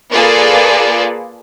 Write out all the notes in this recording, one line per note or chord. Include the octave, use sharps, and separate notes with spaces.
A#3 F4 G#4 A4 B4 D5